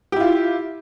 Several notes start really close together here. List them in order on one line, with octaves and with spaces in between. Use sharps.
G4 E4 F4